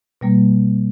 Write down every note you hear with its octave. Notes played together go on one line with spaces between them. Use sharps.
B2 G3 A#3